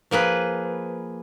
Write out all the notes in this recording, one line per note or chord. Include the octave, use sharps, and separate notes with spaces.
F3 A#3 G#4 B4